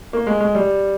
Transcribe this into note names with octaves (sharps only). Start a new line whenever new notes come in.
A#3
G#3
G#3
G3